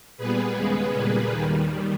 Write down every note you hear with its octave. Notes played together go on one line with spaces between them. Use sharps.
A#2 G3 B3 G#4 B4
D#2 C#3 G#3 B3 G#4 B4
A#2 G3 A#3
D#2 D#3 G3